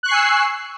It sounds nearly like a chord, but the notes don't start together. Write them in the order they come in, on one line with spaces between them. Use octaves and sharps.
F#6 C#6 C7 G#5 E6